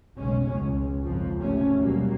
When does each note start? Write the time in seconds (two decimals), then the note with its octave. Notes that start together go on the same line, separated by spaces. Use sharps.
0.17 F1 B1 C#3 G#3 C#4
0.55 C#2
1.05 G#1 F2 F3
1.38 D#2 C3 A3 C#4
1.79 B2 F#3 G3 A#3